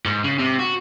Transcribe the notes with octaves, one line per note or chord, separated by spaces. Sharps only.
G#2
C#3
C3
F#4